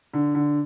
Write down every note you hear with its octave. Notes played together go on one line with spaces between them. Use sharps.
D3
D3